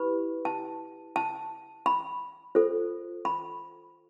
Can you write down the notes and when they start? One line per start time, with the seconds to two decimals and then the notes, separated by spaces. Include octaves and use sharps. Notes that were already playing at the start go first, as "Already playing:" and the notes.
Already playing: E4 G4 B4 B5
0.45 A5
1.16 A5
1.86 B5
2.55 F4 A4 C5
3.25 B5